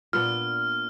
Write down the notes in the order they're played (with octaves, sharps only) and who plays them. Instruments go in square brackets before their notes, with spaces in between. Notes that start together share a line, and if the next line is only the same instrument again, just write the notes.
[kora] A#2 B3 D4 [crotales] F6